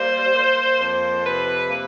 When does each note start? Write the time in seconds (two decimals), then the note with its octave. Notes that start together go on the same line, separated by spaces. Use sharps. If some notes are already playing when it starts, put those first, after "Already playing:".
Already playing: G3 A#3 C5
0.34 A#3
0.79 F2 C5
1.24 C3 B4
1.70 A#3